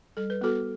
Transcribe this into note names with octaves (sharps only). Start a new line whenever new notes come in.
G3 A4
B4
B3 F#4 A4